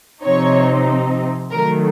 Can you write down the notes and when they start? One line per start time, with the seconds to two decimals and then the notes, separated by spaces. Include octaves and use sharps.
0.23 C3 F3 C4 D#4 C#5
1.51 D#3 F#3 A3 A#4